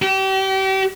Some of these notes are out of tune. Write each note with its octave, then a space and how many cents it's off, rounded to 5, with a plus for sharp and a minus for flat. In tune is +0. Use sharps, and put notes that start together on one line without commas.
G4 -35